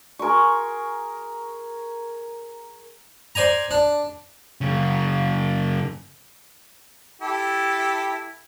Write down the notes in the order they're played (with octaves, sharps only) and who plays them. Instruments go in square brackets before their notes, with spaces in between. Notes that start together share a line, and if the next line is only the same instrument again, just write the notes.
[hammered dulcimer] G#4 A#4 C6 C#6
[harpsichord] C5 D5 G#5 A#5
D4
[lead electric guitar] F#2 C#3
[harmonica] E4 G4 A4